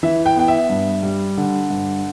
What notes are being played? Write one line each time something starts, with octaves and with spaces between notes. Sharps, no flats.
E3 E5
G5
B3 G5
E5
G2
G3
D3
G2